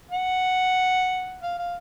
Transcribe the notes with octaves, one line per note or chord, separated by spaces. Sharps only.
F#5
F5
F5